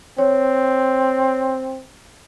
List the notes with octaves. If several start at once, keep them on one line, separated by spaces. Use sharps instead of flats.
C4 C#5